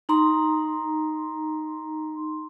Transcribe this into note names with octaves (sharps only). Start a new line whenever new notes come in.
D#4 A#5 C6